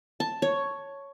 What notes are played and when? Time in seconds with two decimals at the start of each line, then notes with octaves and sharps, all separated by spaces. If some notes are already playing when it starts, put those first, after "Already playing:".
0.20 A5
0.42 C#5